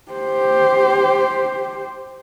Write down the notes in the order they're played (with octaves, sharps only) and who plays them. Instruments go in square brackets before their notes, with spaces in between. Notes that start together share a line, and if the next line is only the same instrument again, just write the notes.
[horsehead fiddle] G4 C5